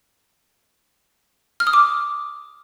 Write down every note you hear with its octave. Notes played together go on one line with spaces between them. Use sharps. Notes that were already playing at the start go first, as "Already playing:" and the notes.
F6
D#6
D6